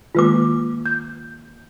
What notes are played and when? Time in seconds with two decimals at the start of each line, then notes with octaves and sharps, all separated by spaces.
0.15 D#3 G#3 A#3 F4 B4 D6
0.86 G6